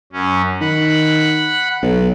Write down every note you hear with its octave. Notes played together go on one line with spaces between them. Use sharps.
F#2 C#4
D#3 F#5 B5
B1